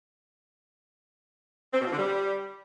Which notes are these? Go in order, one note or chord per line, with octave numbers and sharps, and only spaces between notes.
C4
B2
F3
D3
G3